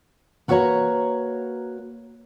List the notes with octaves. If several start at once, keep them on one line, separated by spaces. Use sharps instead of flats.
A#3 F#4 A4 B4 C#5 A#5